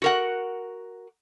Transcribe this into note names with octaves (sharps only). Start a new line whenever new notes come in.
F#4 A#4 F#5